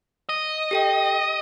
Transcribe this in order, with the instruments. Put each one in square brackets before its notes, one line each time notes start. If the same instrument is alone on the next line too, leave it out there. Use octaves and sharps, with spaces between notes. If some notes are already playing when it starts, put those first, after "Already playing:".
[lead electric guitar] D#5
[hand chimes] G4 A4 G5